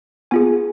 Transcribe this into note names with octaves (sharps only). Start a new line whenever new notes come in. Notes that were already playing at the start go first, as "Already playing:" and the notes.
B3 F4 G#4 G#5